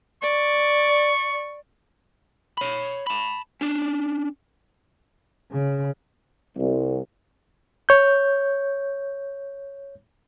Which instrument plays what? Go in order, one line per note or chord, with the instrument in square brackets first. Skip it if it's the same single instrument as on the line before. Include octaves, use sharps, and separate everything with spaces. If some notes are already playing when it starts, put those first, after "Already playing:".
[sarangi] D5 [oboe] C#6
[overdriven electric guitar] C#5 B5
A5 B5
C#4 D4
[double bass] C#3
[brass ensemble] C2
[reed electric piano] C#5 G6